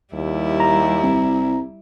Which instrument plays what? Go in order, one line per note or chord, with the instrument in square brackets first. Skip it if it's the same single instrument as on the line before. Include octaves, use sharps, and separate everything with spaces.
[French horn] D#2 [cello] G3 E4
[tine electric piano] A#5
[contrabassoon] C2